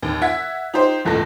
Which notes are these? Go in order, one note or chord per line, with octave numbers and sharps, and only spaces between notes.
D#2
E5 F#5 G#6 B6
D#4 F4 G4 C5
G1 C#2 A2 A4 A5 A#6